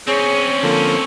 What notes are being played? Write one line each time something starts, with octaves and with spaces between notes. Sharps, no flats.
C4 C#4 G#4 C#5
D3 F3 A#3 A4